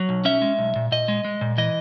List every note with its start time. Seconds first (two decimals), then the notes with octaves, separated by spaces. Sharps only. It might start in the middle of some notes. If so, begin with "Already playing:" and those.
Already playing: F#3
0.09 B1
0.25 C#4 E5
0.42 G#3
0.59 B1
0.76 A#2
0.92 A#2 D#5
1.08 G#3
1.25 G#3
1.41 A#2
1.58 E3 D#5